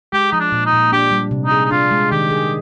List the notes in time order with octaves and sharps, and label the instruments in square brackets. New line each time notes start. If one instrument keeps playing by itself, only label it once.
[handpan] G#3 [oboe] G4
[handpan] F3 [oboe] D#4
[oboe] D4
[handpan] A#2
[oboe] D#4
[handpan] A#2
[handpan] D4 [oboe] G4
[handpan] G3
C3
[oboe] D#4
[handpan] G#4
[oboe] D#4
[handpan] D4 [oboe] F4
[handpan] G#3
[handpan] D#3 [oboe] G4
[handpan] G#4